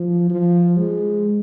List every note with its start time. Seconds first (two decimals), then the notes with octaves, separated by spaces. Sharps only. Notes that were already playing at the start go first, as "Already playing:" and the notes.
Already playing: F3
0.30 F3
0.78 G#3